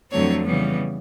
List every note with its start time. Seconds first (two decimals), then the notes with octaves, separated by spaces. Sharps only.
0.11 F2 D3 F#3 A3 C4 C#5
0.45 C#3 E3 G3 B3